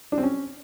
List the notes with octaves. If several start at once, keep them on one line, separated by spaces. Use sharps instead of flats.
D4
C4
C#4